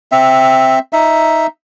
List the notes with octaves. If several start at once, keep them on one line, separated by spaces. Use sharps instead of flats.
C4 E5
D#4 E5